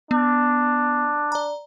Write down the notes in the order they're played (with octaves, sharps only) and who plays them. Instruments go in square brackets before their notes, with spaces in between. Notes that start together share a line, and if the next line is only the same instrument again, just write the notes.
[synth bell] B3 [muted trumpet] D4
[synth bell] D5 A#5